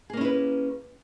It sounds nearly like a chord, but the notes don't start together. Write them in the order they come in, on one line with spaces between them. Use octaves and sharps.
G#4 A#3 C#4 E4 B4